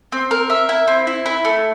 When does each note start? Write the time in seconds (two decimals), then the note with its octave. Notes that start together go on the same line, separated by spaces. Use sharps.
0.12 C4
0.31 A#4
0.50 E5
0.69 E4
0.87 C4
1.07 E4
1.26 E4
1.45 A3